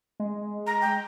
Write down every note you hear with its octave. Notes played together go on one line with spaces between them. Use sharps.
G#3
A#5
G5